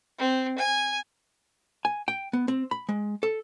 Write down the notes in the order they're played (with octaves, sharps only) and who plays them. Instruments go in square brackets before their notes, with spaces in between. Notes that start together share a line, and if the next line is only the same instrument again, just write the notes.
[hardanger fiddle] C4
G#5
[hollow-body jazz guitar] G#5
G5
B3
C4
B5
G#3
A4